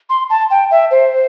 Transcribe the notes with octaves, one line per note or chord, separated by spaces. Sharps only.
C6
A5
G5
E5
C5